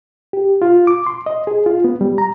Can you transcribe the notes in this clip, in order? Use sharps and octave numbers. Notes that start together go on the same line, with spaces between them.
G4
F4
D6
C6
D#5
G#4
F4
B3
G3
A#5